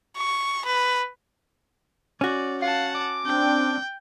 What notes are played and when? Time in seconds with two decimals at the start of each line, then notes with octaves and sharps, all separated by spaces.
0.17 C#6
0.66 B4
2.21 C#4 F#4 D5
2.62 F5 F#5 A5
2.95 D6
3.25 C4 D4 G5